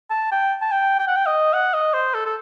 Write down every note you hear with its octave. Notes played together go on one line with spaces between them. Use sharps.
A5
G5
A5
G5
G5
F#5
G5
D#5
F#5
D#5
C5
A4
A4